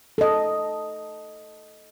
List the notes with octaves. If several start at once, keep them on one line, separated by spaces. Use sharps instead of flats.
A4 D#5